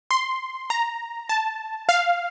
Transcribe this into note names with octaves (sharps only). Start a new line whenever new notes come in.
C6
A#5
A5
F5